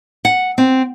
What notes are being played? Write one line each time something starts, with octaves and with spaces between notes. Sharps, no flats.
F#5
C4